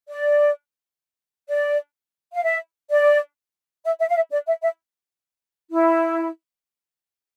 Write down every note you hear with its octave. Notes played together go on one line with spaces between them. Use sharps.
D5
D5
F5
E5
D5
E5
E5
F5
E5
D5
E5
E5
E4